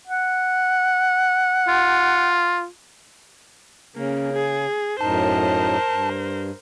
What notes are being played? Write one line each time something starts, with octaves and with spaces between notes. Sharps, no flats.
F#5
F4
C#3 A#3 C#4
G#4
F#2 A2 D#4 A#4 C5 A5
G2